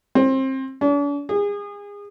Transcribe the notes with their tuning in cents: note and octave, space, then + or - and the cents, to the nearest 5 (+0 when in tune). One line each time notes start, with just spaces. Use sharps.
C4 +25
D4 -45
G#4 -30